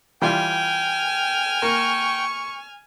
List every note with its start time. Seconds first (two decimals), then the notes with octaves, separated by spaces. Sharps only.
0.22 E3 G3 F4 G5 G#5 F6
1.62 A#3 C#6